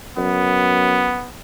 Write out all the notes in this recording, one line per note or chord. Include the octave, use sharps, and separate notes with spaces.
F#2 B3